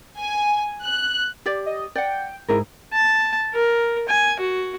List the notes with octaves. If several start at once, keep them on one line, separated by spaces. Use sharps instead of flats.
G#5
F#6
G4 D5
D#5
D5 F#5 G5
G#2 E4 G#4 A#4
A5
A#4
G#5
F#4